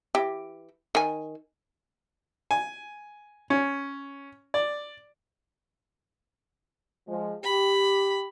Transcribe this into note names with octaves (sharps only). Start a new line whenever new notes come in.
E3 G4
D#3 G#5
G#5
C#4
D5
F3 G#3
G4 B5